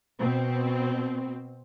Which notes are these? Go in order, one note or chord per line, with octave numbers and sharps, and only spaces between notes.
B2 C4